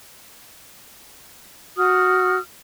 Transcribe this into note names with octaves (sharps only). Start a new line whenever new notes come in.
F#4 D#6 F6